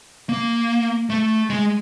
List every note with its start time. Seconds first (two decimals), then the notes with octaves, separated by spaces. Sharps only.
0.29 A#3
1.10 A3
1.50 G#3